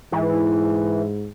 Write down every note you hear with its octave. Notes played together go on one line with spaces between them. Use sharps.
G#2 E3